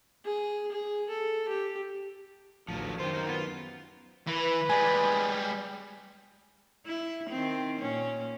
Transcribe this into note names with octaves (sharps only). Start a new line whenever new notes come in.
G#4
G#4
A4
G4
A1 D2 F3 F#3
F#2 D#3 F4 G4 C5
A#3 D#4
B3 F4
E3 B4
G3 G#3 G#5
E4
D#3 C4
A#2 C#4